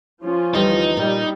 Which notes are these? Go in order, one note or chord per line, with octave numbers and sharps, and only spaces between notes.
F3 C#4 F4
D2 E3 G3 D#4
A#2 G3